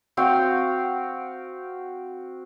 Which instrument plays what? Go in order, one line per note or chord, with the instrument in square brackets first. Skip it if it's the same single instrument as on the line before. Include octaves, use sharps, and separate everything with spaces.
[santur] C4 F#4 F5 G5